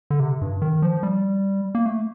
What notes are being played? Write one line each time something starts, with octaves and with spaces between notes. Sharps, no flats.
D3
C3
G2
D#3
F3
G3
A#3
A3